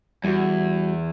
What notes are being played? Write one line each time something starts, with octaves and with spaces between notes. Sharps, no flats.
E2 G3 F#4